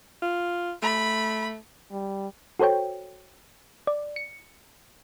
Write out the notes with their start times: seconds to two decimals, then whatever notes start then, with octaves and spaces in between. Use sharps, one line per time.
0.22 F4
0.82 A3 B5
1.92 G3
2.60 F#4 A4 C5 C#5 G5
3.87 D5
4.16 C#7